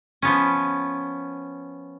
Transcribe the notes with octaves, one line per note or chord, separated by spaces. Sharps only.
F3 B3 C#4